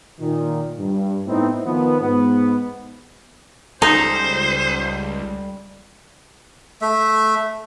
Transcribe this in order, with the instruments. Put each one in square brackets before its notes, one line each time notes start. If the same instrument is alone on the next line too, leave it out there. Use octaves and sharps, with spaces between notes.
[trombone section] A#2 D#3
G2
A2 B3 C4 D#4 E4
D#3 F3 B3
G#2 B3
[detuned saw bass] C#2 [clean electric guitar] G3 A4 G#5 [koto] D#4 [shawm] C5
[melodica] A3 E5